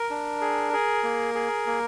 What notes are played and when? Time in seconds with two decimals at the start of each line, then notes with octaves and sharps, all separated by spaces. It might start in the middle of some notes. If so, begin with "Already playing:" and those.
Already playing: A#4
0.10 D4
0.41 G#4
0.73 G#4
1.03 A#3
1.35 G#4
1.67 A#3